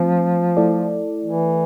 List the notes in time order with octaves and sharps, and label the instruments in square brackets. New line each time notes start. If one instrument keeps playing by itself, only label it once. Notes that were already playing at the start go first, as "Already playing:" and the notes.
Already playing: [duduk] F3 [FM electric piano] A3 C4 F4
[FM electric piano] A3 E4 A4 D5
[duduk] E3